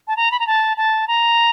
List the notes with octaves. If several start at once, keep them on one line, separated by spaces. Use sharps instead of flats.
A5
A#5
B5
A#5
A5
A5
A#5